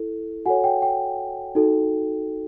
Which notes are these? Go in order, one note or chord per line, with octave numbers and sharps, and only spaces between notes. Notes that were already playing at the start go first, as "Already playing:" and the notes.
Already playing: E4 A4
F#4 A4 C#5 F#5 G#5
G5
G5
D#4 F#4 A4